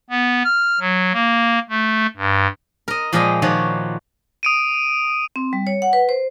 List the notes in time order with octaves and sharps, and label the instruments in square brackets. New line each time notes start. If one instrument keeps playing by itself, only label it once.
[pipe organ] B3
F6
F#3
A#3
A3
G2
[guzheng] A#4 D#5
A#2 F3 G#3 A#4 D#5 G5
D#3 F3 F#4 C#5 D5
[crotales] D#6 D7 D#7
[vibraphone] C4
G3
C#5
F#5
B4
C5